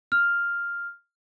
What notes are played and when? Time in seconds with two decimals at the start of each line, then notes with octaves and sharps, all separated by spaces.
0.12 F6